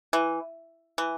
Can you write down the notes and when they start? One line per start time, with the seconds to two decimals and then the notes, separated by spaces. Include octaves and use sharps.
0.13 E3
0.98 E3